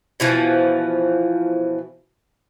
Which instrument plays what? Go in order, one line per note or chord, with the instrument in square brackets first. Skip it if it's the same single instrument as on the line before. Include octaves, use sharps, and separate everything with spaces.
[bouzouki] B2 E3 F3